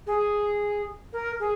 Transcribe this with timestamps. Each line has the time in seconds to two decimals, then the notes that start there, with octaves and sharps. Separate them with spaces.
0.06 G#4
1.13 A#4
1.40 G#4